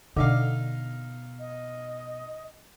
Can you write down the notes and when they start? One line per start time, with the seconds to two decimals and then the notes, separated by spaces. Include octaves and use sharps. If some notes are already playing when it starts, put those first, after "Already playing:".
0.16 B2 D3 D#4 E5 F5
1.40 D#5